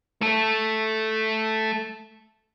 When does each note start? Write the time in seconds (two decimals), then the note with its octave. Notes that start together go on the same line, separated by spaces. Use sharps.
0.21 A3 A4